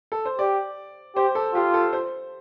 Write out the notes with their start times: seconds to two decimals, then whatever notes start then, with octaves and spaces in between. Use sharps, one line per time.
0.12 A4
0.25 C5
0.39 G4 D5
1.16 G4 C5
1.35 A4
1.54 F4 G4
1.74 A4
1.93 C5